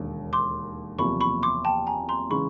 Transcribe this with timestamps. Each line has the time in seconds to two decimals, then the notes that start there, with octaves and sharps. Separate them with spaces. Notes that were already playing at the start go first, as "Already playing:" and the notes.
Already playing: E1 D#2 D3
0.33 C6 D6
0.98 F#1 E2 C3 F3 A#3 B5 C#6
1.21 B5 C#6
1.43 C6 D6
1.65 G5 A5
1.87 G#5 A#5
2.09 A#5 C6
2.30 C#3 E3 G#3 B5 C#6